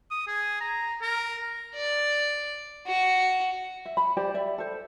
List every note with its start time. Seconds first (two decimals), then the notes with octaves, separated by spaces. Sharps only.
0.11 D#6
0.27 G#4
0.60 A#5
1.01 A#4
1.75 D5
2.86 F#4
3.85 E5
3.97 B5
4.17 G4 C5 D5 G5
4.34 D5 E5
4.58 A4 C5